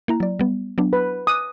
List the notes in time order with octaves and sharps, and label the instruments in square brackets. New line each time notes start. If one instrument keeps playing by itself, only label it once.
[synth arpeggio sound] A#3 E4 A#5
F#3 D5
G3 B3
F#3 B3 D4
[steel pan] B4
[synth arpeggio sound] D6 F#6 [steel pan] D#6